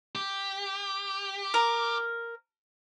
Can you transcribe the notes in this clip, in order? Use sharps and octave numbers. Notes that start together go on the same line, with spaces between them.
G4
A#4